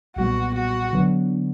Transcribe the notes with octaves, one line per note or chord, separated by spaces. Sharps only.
B1 A#2 G3 B3 F#4
F#4
D3 F#3 B3